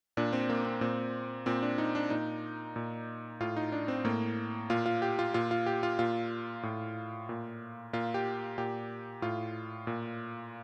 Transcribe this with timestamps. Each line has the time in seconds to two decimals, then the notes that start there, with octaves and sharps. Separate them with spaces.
0.17 A#2 D4
0.33 C4
0.49 A#3
0.65 C4
0.81 A#2 C4
1.46 A#2 C4
1.62 D4
1.78 D#4
1.95 D4
2.10 A#2 D#4
2.76 A#2
3.40 A2 F4
3.56 D#4
3.72 D4
3.88 C4
4.04 A2 A#3
4.70 A#2 F4
4.86 F4
5.02 G4
5.19 F4
5.34 A#2 F4
5.51 F4
5.66 G4
5.83 F4
5.99 A#2 F4
6.63 A2
7.29 A#2
7.93 A#2 F4
8.14 G4
8.58 A#2 G4
9.22 A2 F4
9.87 A#2